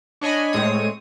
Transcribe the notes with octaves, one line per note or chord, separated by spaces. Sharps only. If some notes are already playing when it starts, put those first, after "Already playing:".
D4 C#5 D#5 G#5 B5
A2 G#3 C4 C#5 D#6